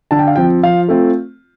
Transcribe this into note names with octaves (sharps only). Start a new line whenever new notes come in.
D3 A5
G5
F5
F3 C4 G5
F3 F5
A3 C4 F4